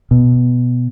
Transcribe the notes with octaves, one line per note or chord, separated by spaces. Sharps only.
B2